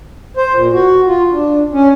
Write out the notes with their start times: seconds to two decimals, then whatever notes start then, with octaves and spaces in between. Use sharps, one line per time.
0.37 C5
0.53 A#2
0.73 F#4
1.06 F4
1.32 D4
1.73 C#4